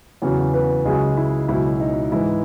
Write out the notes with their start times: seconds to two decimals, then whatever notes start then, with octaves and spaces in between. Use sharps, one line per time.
0.22 E2 C#3 F#3
0.54 B3 B4
0.85 C#2 C#3 F#3 G#3 G#4
1.17 E4
1.48 C#2 B2 F#3 E4
1.80 D#4
2.12 G#2 E3 G#3 E4